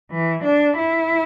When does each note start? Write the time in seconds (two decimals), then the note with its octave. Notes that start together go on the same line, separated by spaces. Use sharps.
0.11 E3
0.44 D4
0.78 E4